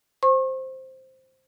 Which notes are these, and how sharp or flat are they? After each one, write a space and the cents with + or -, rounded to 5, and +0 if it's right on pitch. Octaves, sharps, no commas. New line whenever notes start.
C5 +0 C#6 -40